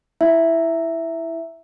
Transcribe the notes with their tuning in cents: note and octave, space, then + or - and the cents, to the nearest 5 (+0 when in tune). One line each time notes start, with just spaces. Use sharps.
E4 +0 E5 +0